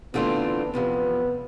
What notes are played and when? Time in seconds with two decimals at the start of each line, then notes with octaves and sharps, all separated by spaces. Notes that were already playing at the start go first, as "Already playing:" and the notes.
0.14 E2 D3 A3 B3 C4 F4
0.73 E2 C3 F3 B3